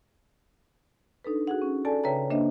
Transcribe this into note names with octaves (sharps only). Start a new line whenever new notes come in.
D4 D#4 A4 B4
F#4 G#4 F#5
C#4
A4 D5 G#5 A5
C#3 B4 C#5 E5 G5 A#5
A#3 D4 C5 D#5 E5